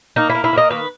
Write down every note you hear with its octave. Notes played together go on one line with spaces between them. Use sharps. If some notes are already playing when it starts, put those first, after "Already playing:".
A#3 D#4
E4
A#3
E4
A#3 D#5
D#3 B4